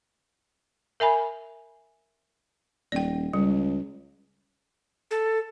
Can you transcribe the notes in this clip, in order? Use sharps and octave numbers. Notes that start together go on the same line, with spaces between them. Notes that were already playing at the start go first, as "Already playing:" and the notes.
A#4 E5 G#5 B5
D#1 D5 G5
C#2 G3
A4